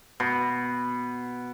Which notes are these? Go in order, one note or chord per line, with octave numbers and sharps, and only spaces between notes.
B2